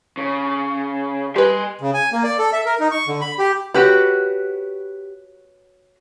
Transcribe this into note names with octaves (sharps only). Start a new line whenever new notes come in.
C#3
G3 B4 G#5 C6
C#3
G#5
A#3
D5
A4
E5
A#4
D#4
C#6
D3
B5
G4
F#4 G4 B4 C#5